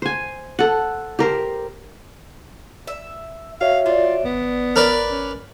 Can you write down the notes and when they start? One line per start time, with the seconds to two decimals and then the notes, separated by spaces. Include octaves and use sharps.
0.02 C5 G#5
0.59 A4 F#5
1.19 G4 A#4 C5
2.87 E5
3.61 F#4 C#5 E5 F5
3.86 D4 F4
4.24 G#1 B3
4.76 A#4 B4 D5
5.10 C#4